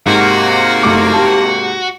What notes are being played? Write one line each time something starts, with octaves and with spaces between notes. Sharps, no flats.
G#2 C3 A#3 F#4
F#1 A3 D6
G4 A5